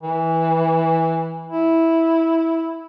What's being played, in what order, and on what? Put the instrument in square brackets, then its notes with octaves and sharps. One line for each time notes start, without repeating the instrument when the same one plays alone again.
[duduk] E3
E4